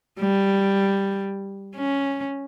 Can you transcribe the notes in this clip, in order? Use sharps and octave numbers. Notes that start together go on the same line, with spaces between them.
G3
C#4